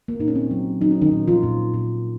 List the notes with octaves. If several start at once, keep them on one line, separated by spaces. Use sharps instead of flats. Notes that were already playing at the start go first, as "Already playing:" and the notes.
A#3
A#2 D#4
C#4
C4
F#3
F#3 D#4
C#4
D#3 D#4
A#2
F3 F4
A#2
A#2